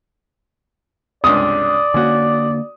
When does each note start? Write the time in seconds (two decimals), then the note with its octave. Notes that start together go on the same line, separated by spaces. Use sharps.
1.24 C#2 G2 C3 D5 D#6
1.94 D3 A#3 C#4 F#4